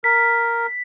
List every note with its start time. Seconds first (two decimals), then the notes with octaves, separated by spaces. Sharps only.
0.04 A#4 B6